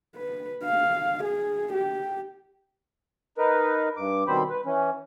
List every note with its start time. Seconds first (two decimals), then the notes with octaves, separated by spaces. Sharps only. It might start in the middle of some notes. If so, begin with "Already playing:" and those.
0.16 B4
0.64 F5
1.23 G#4
1.73 G4
3.38 D#4 A#4 B4
3.97 G2 D6
4.28 B2 D#3 G3 C4 C5 B5
4.50 B4
4.65 E3 C#4